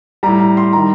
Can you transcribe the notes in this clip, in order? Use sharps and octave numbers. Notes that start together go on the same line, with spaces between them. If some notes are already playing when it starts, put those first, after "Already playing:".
A2 G3 A#5
A#5
C6
D#3 G3 A#5